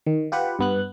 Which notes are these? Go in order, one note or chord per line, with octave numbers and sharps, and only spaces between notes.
D#3
F4 G4 B4 F#5
G2 B3 F#6